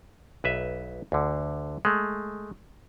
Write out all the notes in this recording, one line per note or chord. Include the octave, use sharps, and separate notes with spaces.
B1 B4 E5
D2 D3
G#3 A3